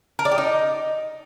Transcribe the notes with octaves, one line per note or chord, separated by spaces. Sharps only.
A#4
D5
G4
D#4